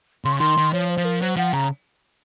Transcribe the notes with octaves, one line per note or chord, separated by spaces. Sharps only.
C#3 C6
C#6
D#3 C6
D#3
F3 C#5
C5
F3
A#4
F#3 C5
F3 F#5
C#3 A#5